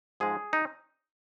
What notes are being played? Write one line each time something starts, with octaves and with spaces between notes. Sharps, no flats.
G#2 F3 G#3 G#4
D#4